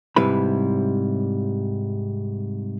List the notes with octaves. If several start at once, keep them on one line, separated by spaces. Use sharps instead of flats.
G#2 C3 G3 E4 B4 B5